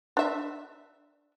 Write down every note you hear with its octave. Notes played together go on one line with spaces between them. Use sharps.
D4 E5